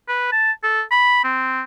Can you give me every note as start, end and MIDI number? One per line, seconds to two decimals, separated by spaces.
0.08 0.30 71
0.32 0.52 81
0.64 0.82 69
0.91 1.24 83
1.24 1.62 60